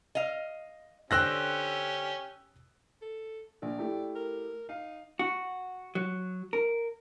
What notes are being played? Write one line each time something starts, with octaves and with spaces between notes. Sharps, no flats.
D#5 F5
D3 C#4 G4 C5 G5 E6 F#6 A#6
A4
A#1 D5
A3 E4 G4
A#4
D#4 F5
F#4
F#3
A#4